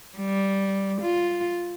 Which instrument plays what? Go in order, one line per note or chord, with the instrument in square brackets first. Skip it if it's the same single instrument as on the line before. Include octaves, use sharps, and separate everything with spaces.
[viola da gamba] G3
F4